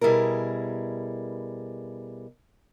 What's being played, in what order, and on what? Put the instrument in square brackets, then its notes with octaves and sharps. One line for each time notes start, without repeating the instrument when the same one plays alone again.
[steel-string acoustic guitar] B2 G3 E4 G#4 A#4